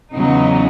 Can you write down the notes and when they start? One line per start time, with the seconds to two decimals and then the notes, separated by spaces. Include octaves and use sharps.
0.14 E2 C#3 F#3 B3 D#4